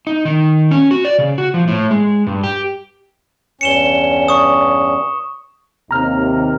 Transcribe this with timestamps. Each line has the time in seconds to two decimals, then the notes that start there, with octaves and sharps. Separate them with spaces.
0.07 D#4
0.25 D#3
0.71 C#4
0.91 F#4
1.05 D5
1.19 C#3
1.38 F#4
1.54 F3
1.68 A2
1.91 G#3
2.27 G2
2.44 G4
3.61 E2 G2 C#4 C#7 E7 G7
4.28 C#6 D#6
5.91 D#2 C3 A#5 F6